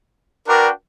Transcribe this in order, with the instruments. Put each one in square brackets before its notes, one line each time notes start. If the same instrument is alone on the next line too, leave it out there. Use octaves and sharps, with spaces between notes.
[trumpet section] D4 F#4 B4 D5 G5 [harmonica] A#4